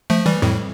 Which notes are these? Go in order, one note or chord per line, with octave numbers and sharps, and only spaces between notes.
F3 A3
E3 G3
F2 A2